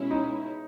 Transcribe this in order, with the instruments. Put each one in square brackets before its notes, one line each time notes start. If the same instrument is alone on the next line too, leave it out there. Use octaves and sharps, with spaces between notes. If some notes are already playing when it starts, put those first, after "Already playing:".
Already playing: [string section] B2 G#3 C#4 E4
[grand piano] D#4